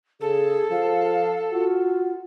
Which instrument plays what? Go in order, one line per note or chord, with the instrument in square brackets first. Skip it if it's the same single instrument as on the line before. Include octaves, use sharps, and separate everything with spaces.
[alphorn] C#3 [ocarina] G#4 [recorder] A4
[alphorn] F3 [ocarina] F5
[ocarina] F4 [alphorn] F#4